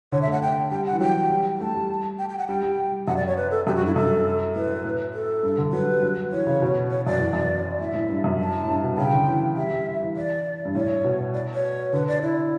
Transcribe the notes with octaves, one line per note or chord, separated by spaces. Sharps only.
D3 C#5
E5
A3 F#5
A3 G5
G3 G5
F#5
E3
F#3 G5
G3
A3 A5
G3
G5
G5
F#5
G3 G5
G3
F#2 F#5
D5
C#5
B4
A4
F#2 G4
F#4
G2 E4
F#2 A4
A2 B4
A2
A4
G2
D3
F#3 B4
G3
G3
F#3
E3 C#5
C#3
B2
C#5
F#2 D5
E2
F#2
A2 E5
A2
G2
F#2
A5
A2
G2
B2
C#3 G5
D3
E3
G3 E5
G3
E3
D5
G2
A2 C#5
B2
D5
C#5
D3 B4
D5
E4